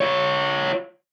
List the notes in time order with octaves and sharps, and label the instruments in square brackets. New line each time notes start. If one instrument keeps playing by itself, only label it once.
[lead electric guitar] F4 C#5